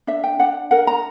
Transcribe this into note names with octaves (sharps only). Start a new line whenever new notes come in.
D4 E5
G5
D4 F#5
A#4 F#5
A#5